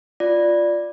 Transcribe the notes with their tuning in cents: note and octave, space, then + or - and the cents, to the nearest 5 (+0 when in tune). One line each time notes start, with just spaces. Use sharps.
F4 +0 D5 +0